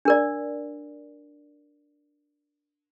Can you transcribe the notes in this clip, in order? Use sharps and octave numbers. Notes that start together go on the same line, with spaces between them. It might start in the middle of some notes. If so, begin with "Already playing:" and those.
D4 A#4 D5